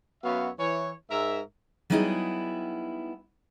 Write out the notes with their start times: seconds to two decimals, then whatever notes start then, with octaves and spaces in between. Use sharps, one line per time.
0.24 F#2 B3 F#4 C#5 E5 F5
0.59 E3 C#5
1.11 G#2 A#4 E5
1.90 F#3 G3 B3 D#4 E4 G#4